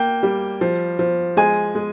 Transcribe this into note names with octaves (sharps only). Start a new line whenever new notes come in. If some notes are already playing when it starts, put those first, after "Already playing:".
Already playing: A#3 G5
G3
F3
F3
G#3 G#5
G#3